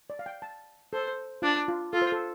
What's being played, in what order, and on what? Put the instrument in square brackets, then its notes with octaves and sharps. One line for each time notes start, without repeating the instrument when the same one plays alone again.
[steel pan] D5
F5
G5
A5
[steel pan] A4 [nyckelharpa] C5
[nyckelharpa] D4 [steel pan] F4
[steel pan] F4
[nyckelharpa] F4 [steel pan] A4
[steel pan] C5
A4